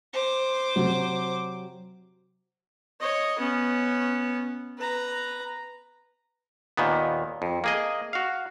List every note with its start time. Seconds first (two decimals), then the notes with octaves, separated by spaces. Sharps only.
0.14 C5 D6
0.76 C3 F#3
3.00 C#5 D#5
3.39 B3 C#4
4.78 B4 A#5
6.77 D#2 A#2 D#3 B3
7.42 F2
7.64 A#3 G#4 D#5
8.13 F#4 F5